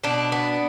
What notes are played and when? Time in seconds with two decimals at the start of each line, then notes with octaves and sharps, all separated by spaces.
0.04 B2 D4
0.32 B3